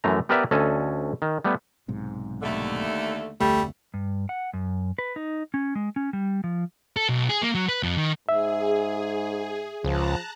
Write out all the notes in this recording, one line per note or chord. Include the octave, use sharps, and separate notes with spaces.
F#2 E3 A3 A#5
B3 G4 A#4 B4 D5 E5
D2 C#4 A4 D#5
D#3
G3 A3 B3
B1 G#2 C3
D#2 D3 A3
F1 D2 C3 G3 A3
G2
F#5
F#2
B4
D#4
C#4
G#3
C#4
G3
F3
A4
B1
G#4
A#3
F#3
B4
F2
D#3
G#2 G#4 E5
C#2 F3 A5 A#5 F#6